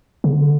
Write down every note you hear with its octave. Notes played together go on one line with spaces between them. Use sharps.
C#3
D3